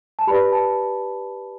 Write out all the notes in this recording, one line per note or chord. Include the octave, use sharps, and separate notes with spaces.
A5
G4 B4 D5 B5
A5